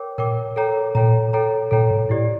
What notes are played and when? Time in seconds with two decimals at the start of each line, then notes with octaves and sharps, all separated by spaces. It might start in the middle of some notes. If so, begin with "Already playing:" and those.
Already playing: A#4 C#5 G5 D6
0.18 A#2 A#4 C#5 G5 D6
0.56 A4 C#5 G5 A#5
0.95 A#2 A4 C#5 G5 A#5
1.33 A4 C#5 G5 A#5
1.71 A#2 A4 C#5 G5 A#5
1.91 A2
2.09 A#2 E4 G4 D5